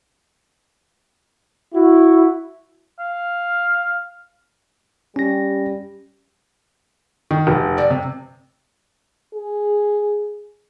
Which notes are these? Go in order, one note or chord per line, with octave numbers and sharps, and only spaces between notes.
E4 F#4
F5
G3 C#4 G4 A#6
D#3
F1
D5
C3
G#4